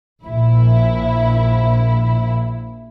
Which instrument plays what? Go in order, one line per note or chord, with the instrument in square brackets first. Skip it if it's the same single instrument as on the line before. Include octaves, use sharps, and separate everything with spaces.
[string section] A#1 E4